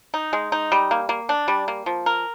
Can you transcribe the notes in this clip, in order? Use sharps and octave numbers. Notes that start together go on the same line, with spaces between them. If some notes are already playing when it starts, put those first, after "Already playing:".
D#4
G#3
D#4
G3
A#3
A#3
D4
G3
A#3
F3
A#4